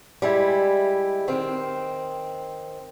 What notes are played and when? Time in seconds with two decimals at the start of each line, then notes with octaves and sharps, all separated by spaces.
0.22 G3 G#3 E4
1.28 D#3 C4